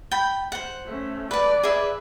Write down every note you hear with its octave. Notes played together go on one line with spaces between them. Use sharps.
G5 B5
C5 F#5
A3 C#4
B4 D5 A5
G#4 B4 E5